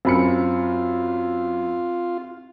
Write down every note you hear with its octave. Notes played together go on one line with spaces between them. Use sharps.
F#2 C4 F4 B5 C#7